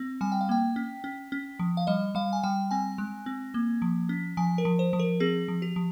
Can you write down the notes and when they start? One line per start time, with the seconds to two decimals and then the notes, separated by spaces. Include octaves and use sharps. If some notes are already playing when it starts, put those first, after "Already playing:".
Already playing: C4
0.21 G3 G#5
0.32 G5
0.41 F5
0.49 A#3 G5
0.76 C#4
1.04 C#4
1.32 C#4
1.59 F3
1.77 F5
1.87 G3 D#5
2.15 G3 F5
2.33 G#5
2.43 G3 G5
2.71 C4 G#5
2.98 G#3
3.26 C4
3.54 A#3
3.82 F3
4.09 C#4
4.37 F3 G#5
4.58 A#4
4.65 F3
4.79 C5
4.93 F3
4.99 A#4
5.20 C4 G#4
5.48 F3
5.62 G4
5.76 F3